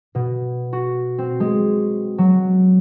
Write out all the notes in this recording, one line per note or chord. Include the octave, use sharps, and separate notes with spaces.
B2
F#4
C4
G#3
F#3